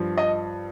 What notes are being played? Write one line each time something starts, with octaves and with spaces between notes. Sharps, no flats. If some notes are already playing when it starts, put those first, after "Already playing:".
Already playing: G2 F3
D#5